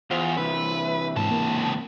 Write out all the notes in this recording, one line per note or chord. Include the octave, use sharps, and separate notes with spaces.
E2 F4 C5
C3 E3 B4 E5
C#2 G#2 A5
A#3